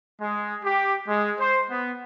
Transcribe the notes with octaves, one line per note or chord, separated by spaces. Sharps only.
G#3
G4
G#3
C5
B3